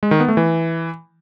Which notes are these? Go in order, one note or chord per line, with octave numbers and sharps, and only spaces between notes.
G#3
D#3
B3
A3
E3